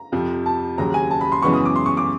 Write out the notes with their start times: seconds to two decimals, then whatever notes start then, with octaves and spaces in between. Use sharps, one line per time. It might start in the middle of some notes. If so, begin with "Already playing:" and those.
Already playing: A#5
0.12 F2 C3 F3
0.46 A5
0.78 D#2 C#3 F#3 A#5
0.94 G#5
1.11 A5
1.21 B5
1.32 C6
1.42 F#2 C#3 E3 G#3 B3 C#6
1.54 D#6
1.65 D6
1.76 C6
1.86 C#6
1.97 D6